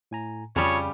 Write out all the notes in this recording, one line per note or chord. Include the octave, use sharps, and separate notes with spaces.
A2 G#5 A#5
F2 C#3 G3 F4 C#5 A5 D#6